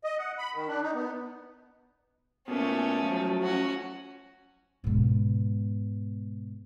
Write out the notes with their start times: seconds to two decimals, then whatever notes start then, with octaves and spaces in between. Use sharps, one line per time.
0.04 D#5
0.19 F#5
0.38 B5
0.55 D#3
0.68 D4
0.82 D#4
0.95 B3
2.48 B2 A3 A#3 C#4
3.03 F3 F#3
3.43 C#4 F#4
4.84 G#2 B2